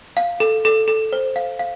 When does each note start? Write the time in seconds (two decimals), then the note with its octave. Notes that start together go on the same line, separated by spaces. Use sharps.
0.17 F5
0.40 A4
0.65 A4
0.88 A4
1.13 C5
1.36 F5
1.59 F5